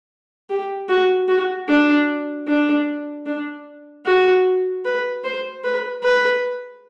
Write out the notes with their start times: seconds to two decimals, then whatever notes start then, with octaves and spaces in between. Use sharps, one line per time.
0.50 G4
0.88 F#4
1.28 F#4
1.68 D4
2.47 D4
3.26 D4
4.05 F#4
4.85 B4
5.24 C5
5.64 B4
6.03 B4